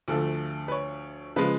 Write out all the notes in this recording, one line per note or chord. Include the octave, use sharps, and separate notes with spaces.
D2 D3 F3 A3 A4
B4
C#5
C#3 F3 G#3 B4